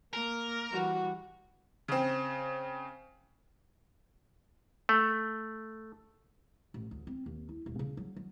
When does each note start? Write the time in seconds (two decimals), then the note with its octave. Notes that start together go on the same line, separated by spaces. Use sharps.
0.13 A#3 A#4
0.73 E3 G3 F#4
1.88 C#3 C4
4.89 A3
6.74 A1
6.91 D2
7.07 C4
7.26 D#2
7.49 E4
7.66 D#1
7.79 C#3
7.97 F#3
8.16 F#3